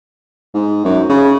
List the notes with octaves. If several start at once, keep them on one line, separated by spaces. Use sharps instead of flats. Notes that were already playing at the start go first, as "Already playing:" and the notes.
G#2
F#2
C#3